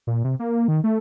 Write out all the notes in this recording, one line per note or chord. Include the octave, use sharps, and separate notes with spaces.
A#2
C3
A#3
D#3
A3